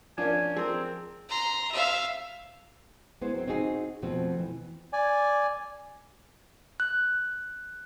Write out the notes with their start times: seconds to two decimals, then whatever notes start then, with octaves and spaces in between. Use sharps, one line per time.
0.18 F3 A#3 C#4 D4 G#5
0.57 F3 C4 G#4 A#4
1.29 A#5 C6
1.71 E5 F5
3.21 G#3 B3 E4 C5
3.34 F#3 C4
3.47 C4 D#4 F#4 G#4
4.02 F2 B2 F3 A3 C4
4.38 E3
4.93 D5 G#5
6.80 F#6